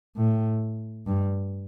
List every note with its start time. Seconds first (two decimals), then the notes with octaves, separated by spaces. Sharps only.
0.16 A2
1.07 G2